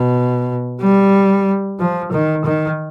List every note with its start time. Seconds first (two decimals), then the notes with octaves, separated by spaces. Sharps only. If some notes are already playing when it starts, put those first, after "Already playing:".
Already playing: B2
0.82 G3
1.80 F3
2.12 D#3
2.45 D#3